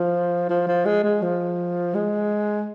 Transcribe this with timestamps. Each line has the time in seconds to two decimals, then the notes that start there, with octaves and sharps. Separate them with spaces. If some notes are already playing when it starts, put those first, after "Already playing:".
Already playing: F3
0.49 F3
0.67 F3
0.86 G#3
1.04 G#3
1.22 F3
1.94 G#3